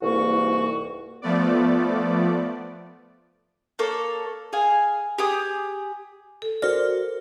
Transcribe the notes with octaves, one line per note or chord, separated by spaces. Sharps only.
C2 G#2 E3 A#3 F#4 C#6
F3 A3 B3 D5
A#3 A4 C#5
G#4 F5 G#5
G4 G#4 D#6
A4
F#4 A#4 C5 D5 F6